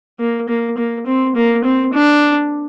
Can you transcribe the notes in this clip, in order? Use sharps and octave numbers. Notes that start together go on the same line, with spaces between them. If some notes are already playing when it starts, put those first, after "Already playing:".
A#3
A#3
A#3
C4
A#3
C4
D4